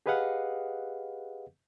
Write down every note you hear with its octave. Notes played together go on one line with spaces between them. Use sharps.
G4 G#4 B4 D#5 F5 F#5